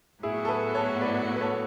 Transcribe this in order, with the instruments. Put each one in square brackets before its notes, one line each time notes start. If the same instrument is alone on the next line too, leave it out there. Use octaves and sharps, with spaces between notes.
[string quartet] A2 F#3 B3 F#4 [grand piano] E4 G#4
[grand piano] A4
G#4 B4
A4 C#5
B4 D5
B4
A4 C#5